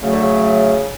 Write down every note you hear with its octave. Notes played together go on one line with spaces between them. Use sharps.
C#3 F#3 A3
D3
C#3